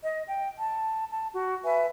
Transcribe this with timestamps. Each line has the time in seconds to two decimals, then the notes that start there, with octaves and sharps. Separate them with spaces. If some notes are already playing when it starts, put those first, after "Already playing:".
0.03 D#5
0.27 G5
0.59 A5
1.11 A5
1.34 F#4
1.65 B4 E5 G#5